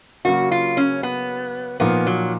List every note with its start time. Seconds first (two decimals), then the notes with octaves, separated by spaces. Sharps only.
0.25 C#3 F#3 A#3 F#4
0.52 F4
0.77 C#4
1.03 B3
1.80 A#2 F3 A#3 B3 D#4
2.07 F#3